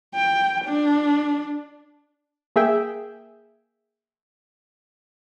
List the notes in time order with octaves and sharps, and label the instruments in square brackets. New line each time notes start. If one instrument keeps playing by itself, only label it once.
[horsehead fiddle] G5
D4
[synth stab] A#3 G#4 E5 G5